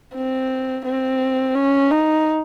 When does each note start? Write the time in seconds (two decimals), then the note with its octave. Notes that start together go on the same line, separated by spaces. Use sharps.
0.15 C4
0.85 C4
1.55 C#4
1.91 D#4